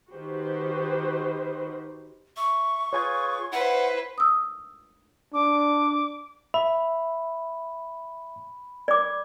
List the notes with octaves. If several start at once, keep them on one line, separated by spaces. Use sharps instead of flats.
D#3 F#4 G4 B4 C5
E5 C#6
F4 G#4 B4 C#5 G#5 G#6
E4 B4 C5 F#5
D#6 E6
D4 D6
E5 B5
D5 D6